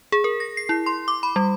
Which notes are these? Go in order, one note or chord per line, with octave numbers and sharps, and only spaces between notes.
G#4
A#4
A#6
C7
E4
C6
D6
B5
G3